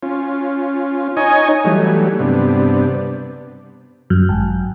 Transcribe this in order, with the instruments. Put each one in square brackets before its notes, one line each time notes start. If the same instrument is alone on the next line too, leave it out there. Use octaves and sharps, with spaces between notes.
[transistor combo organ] C#4 F4
D#4 C#5 D#5 G#5
E3 F#3 G3 A3
G2 C3 B3 D4
[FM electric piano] F#2
G#1